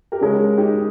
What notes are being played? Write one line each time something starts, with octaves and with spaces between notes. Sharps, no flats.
G4 A#4
C#3 G#3 C#4
D#4 G4